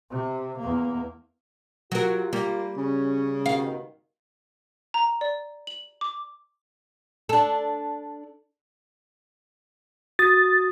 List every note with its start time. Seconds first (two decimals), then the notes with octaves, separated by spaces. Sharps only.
0.11 C3
0.59 E2 A#3
1.92 F#3 F4 G4 A#4
2.33 G3 A#3
2.77 C#3 C#4
3.46 G2 B2 D#3 F5
4.94 A#5
5.21 D5
5.67 F#7
6.01 D6
7.29 D4 A4
10.19 F#4 D#6 A6